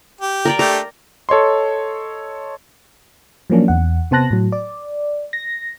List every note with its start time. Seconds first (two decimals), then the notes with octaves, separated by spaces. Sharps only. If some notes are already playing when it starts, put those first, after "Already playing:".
0.21 G4
0.45 A#4 D5 G5
0.59 A3 D4 G4 A#5
1.29 A4 C#5 D#5 C6
3.50 F3 F#3 A#3 C#4 D4
3.68 E2 F#5
4.11 C3 B3 C5 A5 F#6 A#6
4.31 A2 F#3
4.52 D5
5.33 A#6